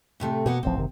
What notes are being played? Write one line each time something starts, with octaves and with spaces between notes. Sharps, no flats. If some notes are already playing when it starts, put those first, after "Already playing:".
A2 C3 A3
B2 A#3 B3 F#5
D1 A1 F3 C4
F#1 C3 D#3